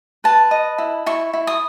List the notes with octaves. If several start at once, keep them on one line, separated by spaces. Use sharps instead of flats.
B4 A5
D#5
E4
E4 C#6
E4
D#6